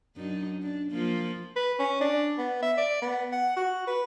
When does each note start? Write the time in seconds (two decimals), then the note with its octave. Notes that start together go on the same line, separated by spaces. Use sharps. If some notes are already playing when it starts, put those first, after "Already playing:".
0.16 F#2 D4 D#4
0.62 D4
0.91 F3 A#3 F4
1.56 B4
1.79 C#4
2.01 D4
2.38 B3
2.63 E5
2.77 D5
3.02 B3
3.32 F#5
3.56 F#4
3.87 B4